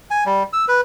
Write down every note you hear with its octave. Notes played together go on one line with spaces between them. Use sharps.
G#5
G3
E6
B4